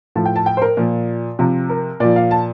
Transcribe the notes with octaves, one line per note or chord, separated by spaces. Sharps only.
A2 F3 A5
G5
A5
G5
C5
A#4
A#2 F3
C3 F3
A#4
A#2 F3 D5
F5
A5